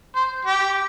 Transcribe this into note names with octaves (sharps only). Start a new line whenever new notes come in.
C5
G4